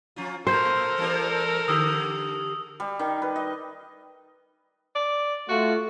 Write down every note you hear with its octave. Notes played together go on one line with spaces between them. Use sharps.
F3 C#4 F4
A2 A4 A#4 C5
E3 G3 C4
D3 G4 D#6 E6
G3
D#3
B4
D#5
D5
A3 F4 F#4